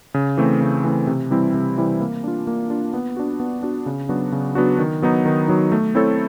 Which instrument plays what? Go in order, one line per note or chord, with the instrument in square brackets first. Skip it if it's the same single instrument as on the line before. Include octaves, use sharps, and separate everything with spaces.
[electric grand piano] C#3
E3 A3 C4
C#3
E3 A3 C4
C3
E3 G3 C4 E4
C3
E3 G3 C4 E4
A#3
D4 F4
A#3
D4 F4
B3
D4 F#4
B3
D4 F#4
C#3
F#3 B3 D4 F#4
C#3
F#3 B3 D4 F#4
D#3
F#3 B3 D#4
D#3
F#3 B3 D#4
A3
C4 E4 A4 C#5